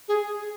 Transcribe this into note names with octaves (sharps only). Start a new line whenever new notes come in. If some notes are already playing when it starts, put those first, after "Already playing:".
G#4